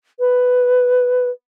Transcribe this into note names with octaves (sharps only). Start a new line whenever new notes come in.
B4